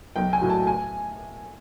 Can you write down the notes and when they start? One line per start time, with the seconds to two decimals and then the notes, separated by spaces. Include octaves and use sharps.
0.16 B1 G5
0.33 G#5
0.41 A2 F#3
0.50 A5
0.67 G#5